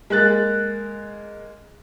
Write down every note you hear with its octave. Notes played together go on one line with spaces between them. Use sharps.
G#3 A#3 F#6 A6